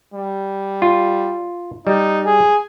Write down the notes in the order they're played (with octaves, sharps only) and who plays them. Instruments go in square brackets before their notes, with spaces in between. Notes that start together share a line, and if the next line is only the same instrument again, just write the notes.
[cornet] G3
[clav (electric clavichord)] F4
[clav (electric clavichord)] G3 [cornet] D#4
[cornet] G#4